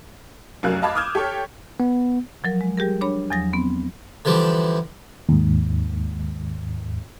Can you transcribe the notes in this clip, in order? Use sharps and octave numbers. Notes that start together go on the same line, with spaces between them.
F1 F#2 F#3 A#4 F5 F#6
D#5 F5 A5 B5 D6 G#6
D6 D#6 F6 G6 G#6 E7
G4 A4 C#5 G5
B3
F3 F#3 A#4
G#3
G3 G4 G#4 A#4
D4 C#5 B5
E2 F3 F#3 D#6 A#6
B3 C4
D3 E3 F3 G3
D#2 G#2